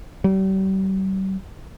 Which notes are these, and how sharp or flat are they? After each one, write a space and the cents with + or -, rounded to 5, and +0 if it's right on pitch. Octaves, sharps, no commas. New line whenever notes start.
G3 -40